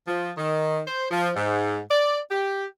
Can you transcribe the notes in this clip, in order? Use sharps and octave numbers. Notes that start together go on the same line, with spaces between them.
F3
D#3
C5
F3
G#2
D5
G4